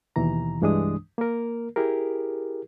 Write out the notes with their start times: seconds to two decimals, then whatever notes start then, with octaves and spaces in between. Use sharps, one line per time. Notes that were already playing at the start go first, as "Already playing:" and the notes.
0.16 D#2 B2 E3 A#5
0.61 C2 G2 E3 G#3 D4 D#6
1.18 A#3 A#4
1.76 E4 G4 G#4 A#4